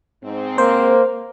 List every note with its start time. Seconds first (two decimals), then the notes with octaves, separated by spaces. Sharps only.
0.24 G#2 C4
0.58 A#3 C5